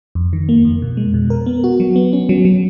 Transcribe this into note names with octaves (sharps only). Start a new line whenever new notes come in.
F2
D#3
A#3
F2
B2
G#3
B2
A#4
B3
F#4
F#3
B3
C#4
F#3
F#3